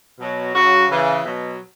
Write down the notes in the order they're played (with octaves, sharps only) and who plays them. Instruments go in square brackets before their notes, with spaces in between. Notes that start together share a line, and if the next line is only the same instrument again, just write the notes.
[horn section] B2 F#3
C#3 F#3 F#4
C#3 E3
B2 F#3